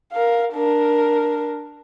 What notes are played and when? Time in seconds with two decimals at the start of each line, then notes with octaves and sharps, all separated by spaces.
0.13 A#4 F5
0.54 D4 A#4